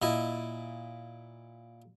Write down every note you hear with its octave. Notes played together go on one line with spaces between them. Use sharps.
A#2 E4 D#5